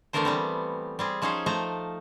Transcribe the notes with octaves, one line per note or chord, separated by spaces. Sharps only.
D3 E3 A3 B3 A#4 C5
G3 B3 C4
G3 C4 G#4
F3 C#4 D#4 G#4 C5
F3 A3 C5 A#5